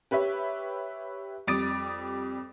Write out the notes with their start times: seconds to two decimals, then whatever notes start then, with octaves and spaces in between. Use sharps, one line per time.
0.11 G4 B4 C#5 E5
1.47 F2 G3 D6 D#6 A6 D7